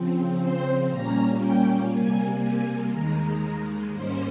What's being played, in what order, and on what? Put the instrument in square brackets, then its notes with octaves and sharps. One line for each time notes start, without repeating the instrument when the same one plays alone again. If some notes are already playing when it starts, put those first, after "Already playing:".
Already playing: [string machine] C#3 F3 C4
C5
A#2 G3 A#3 C#4 A#5
G5
C3 G3 A#3 G#5
G#5
D#2 D#3 G#3 A#5
G#2 G3 A#3 C#4 C5